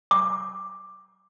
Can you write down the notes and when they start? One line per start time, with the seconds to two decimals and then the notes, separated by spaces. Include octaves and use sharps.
0.11 D6